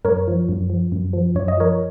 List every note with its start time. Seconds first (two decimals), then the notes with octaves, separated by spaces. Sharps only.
0.05 F#2 A#4 C#5
0.27 F3
0.49 F#2
0.70 F3
0.92 F#2
1.13 F3
1.35 F#2 C#5
1.48 D#5
1.58 F3 A#4 C#5